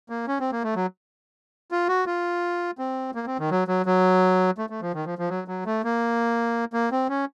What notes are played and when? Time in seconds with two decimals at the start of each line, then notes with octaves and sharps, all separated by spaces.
0.10 A#3
0.28 C#4
0.40 C4
0.52 A#3
0.64 A3
0.76 F#3
1.71 F4
1.88 F#4
2.06 F4
2.78 C4
3.15 A#3
3.27 C4
3.39 D#3
3.51 F#3
3.68 F#3
3.86 F#3
4.58 A3
4.70 A3
4.81 F3
4.94 D#3
5.06 F3
5.18 F3
5.29 F#3
5.48 F#3
5.66 A3
5.84 A#3
6.73 A#3
6.91 C4
7.09 C#4